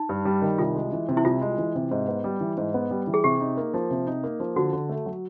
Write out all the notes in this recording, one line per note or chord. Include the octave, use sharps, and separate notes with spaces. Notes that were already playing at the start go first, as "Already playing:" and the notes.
Already playing: D#4
G2
G3
D#3
C2 F4
G#3
E3
C3
E4
C2 F4
G#3
E3
C3
G#2
B3
G3
E3
G#2
B3
G3
E3
G#4
C3 G4
D#4
A#3
F3
C3
D#4
A#3
F3
D3 F#4
D3
A3
F#3